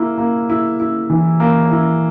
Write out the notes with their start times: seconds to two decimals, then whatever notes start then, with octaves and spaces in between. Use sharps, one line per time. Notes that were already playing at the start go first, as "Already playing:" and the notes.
Already playing: A#3 E4
0.18 A#3
0.50 E4
0.80 E4
1.10 E3
1.40 A#3
1.71 E4